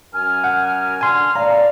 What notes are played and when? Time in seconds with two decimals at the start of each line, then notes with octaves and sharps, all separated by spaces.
0.13 F#2 A#4 G#5 F6
0.44 F#5
1.01 D3 G#5 C6 F6
1.36 A2 D5 F5 A#5